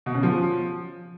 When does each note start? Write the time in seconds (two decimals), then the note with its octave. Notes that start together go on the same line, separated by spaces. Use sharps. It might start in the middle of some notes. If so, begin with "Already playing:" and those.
0.06 B2
0.15 C#3
0.23 F3